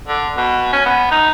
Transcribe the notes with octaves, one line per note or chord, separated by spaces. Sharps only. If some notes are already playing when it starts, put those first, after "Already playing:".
D3
B2
C#4
B3
D#4